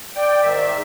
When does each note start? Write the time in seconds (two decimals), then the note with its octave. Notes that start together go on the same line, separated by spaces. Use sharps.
0.16 D5 G5
0.43 G#2 D#3 E5